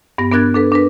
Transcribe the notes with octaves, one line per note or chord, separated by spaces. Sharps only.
G2 B3 A#6
B3 D4 A#4 F#6 G#6 A6
D4 A4 B4
D4 A#4 B4